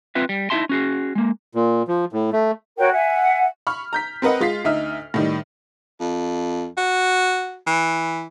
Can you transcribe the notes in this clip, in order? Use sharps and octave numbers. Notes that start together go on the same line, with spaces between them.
C4 F4 B4 E5
G3
D#4 E4 G4 E5 A5 C6
C#4 F#4 G#4
G#3 A#3
A#2
F3
A2
A3
F#4 A#4 C#5 G5
E5 F#5 G#5
B5 C#6 F6
A#5 G6 B6
C4 A#4 B4 D#5 F#5
G#3 F4 B6 C7
D2 D#4 E5 F6
A2 D#3 G3
F2
F#4
E3